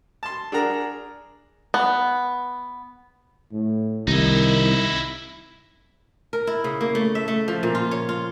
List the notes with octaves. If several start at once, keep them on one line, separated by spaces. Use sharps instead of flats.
A5 C6
D4 G#4 A#4 F#5 A#5
B3
A2
C2 D#3 D#4 E4
A#4
E4
C#3
A#3
A3
E5
A3
F3
A#2
F4
C#5
F4